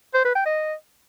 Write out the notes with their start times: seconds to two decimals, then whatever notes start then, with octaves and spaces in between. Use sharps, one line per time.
0.14 C5
0.25 B4
0.35 G5
0.46 D#5